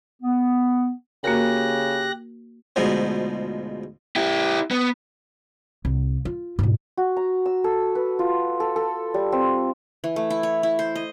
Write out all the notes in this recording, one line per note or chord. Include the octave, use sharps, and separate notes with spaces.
B3
C#3 A#3 F#4 G4 A#4 F#6 A#6
D2 G#2 B2 F3
E4 G4
B3
C2
F4
G#2 B2
F#4
A#5
E6
A4
B4
F4
A4
A4
G3
C4
E3
A3
E4
C#5
E4
C5
D#5